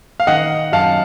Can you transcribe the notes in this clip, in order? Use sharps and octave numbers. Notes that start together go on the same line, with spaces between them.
F5
D#3 D#5 F#5
F#2 F5 A5